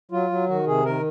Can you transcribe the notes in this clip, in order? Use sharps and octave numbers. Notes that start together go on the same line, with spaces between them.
F#3 F4
F#3
D#3 F#4
C3 G#4
D#3 A#4